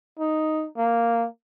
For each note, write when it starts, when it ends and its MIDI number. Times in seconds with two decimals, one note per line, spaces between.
0.19 0.67 63
0.77 1.27 58